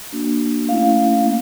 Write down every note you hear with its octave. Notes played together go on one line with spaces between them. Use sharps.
A#3 D4 F#4
A3 C#4 E4 F5
F5
A#3